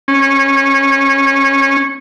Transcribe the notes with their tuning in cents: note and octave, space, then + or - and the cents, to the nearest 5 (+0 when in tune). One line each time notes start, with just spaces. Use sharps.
C#4 -20